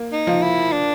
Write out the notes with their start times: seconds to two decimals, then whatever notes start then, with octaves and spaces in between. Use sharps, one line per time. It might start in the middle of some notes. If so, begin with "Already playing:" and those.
Already playing: A#3
0.12 D#4
0.27 F3
0.43 E4
0.72 D4